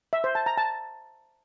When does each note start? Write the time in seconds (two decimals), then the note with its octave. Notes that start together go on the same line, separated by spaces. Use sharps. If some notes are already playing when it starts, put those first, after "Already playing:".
0.13 E5
0.24 C5
0.35 A5
0.46 A#5
0.58 A5